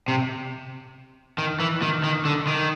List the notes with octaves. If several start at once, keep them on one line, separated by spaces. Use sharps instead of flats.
C3
D#3
E3
D#3
D#3
D3
D#3